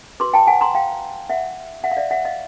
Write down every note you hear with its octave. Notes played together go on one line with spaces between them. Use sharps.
F#4 B4 C6 D6
G5 A5
F#5 G#5
A#5 C6
F5 G5
E5 F#5
E5 F#5
F5
D5 E5
E5 F#5
D#5 F5